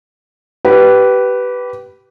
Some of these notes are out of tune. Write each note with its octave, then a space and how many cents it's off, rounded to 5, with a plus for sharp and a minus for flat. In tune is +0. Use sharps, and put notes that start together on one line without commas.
G4 -25 B4 +0